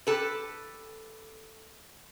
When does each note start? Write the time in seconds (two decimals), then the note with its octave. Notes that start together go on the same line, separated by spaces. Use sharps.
0.07 G4 A4 B4